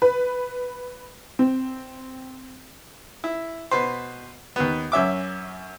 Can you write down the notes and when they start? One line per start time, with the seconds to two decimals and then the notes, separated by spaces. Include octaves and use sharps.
0.02 B4
1.39 C4
3.24 E4
3.71 B2 B4 C5
4.56 D#2 B3
4.92 F#2 C#4 E5 D6